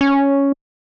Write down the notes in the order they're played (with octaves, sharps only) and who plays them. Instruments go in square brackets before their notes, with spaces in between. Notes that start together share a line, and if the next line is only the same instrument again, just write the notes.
[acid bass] C#4